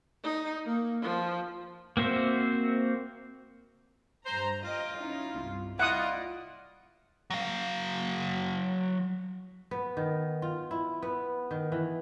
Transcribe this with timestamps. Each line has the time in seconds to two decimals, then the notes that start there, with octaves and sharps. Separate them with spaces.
0.24 D#4
0.65 A#3
1.02 F3
1.97 A#3 C4 F#4 C5 E5
4.26 G2 C5 A#5
4.64 F4 D#5 G5
4.98 C#4 D#4 E4
5.37 C2 G2
5.79 E4 F4 D5 D#5 F#5 D#6
7.30 F#3 F5
9.71 B3
9.97 D#3
10.42 F4
10.71 E4
11.02 B3
11.51 D#3
11.72 E3